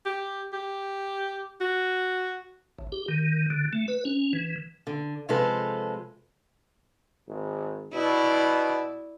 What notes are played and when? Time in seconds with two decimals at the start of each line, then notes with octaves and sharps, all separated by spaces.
0.05 G4
0.53 G4
1.60 F#4
2.79 A1
2.92 G4
3.08 D#3
3.50 D3
3.73 A3
3.88 B4
4.05 C#4
4.33 E3
4.87 D3
5.29 C3 F3 G#3 A4 B4 C5
7.28 G#1
7.94 B2 E4 D5